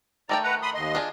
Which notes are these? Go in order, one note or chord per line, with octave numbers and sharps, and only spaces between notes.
D#3 A3 D5 G5 A#5
B4 F#5 A#5
B5 C6 D#6
D#2 D#5 C6
D4 F4 G#4